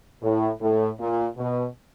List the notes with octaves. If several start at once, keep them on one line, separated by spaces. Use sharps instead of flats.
A2
A2
A#2
B2